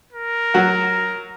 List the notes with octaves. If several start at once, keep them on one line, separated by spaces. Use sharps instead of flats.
A#4
F#3 F#4 F#5